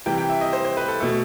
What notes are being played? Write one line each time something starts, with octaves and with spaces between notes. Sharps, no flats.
C3 E3 G3 G5
G5
E5
D#5
C5
C5
B4
A4
B2 A3 A4